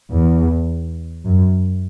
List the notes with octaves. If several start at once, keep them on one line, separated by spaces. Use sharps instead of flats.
E2
F#2